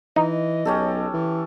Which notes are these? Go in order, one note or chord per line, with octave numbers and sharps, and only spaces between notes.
E3 D#4 D#5
B1 C#4 G4 A4
E3